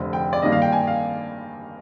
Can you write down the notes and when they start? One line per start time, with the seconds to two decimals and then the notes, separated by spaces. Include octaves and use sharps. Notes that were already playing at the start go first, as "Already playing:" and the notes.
Already playing: F1 F2 D3
0.13 G5
0.33 D5
0.42 G2 D#3 A#3 D4 D#5
0.52 F5
0.62 G5
0.72 G#5
0.87 F5